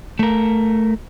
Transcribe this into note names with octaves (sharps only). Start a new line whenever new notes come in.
A3 A#4